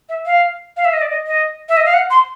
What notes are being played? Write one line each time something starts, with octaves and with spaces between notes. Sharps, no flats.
E5
F5
F5
E5
D#5
D5
D#5
D#5
E5
D#5
F5
F#5
C6